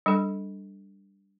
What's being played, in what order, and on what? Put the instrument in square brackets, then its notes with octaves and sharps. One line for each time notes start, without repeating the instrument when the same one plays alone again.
[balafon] G3 D4 A4